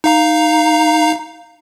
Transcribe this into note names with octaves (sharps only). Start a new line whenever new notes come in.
D#4 F5 A#5